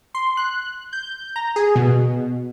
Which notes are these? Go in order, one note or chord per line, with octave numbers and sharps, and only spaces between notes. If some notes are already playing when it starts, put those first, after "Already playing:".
C6
F#6
G6
A#5
G#4
B2